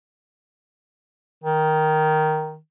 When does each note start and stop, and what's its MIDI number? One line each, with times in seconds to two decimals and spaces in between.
1.44 2.57 51